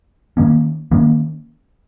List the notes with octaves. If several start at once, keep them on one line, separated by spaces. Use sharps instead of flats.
D#3 A#3 C#4
D#3 A#3 C#4